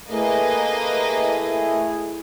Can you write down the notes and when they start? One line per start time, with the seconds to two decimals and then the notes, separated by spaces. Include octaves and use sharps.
0.11 A3 A#3 E4 G#4 B4 D#5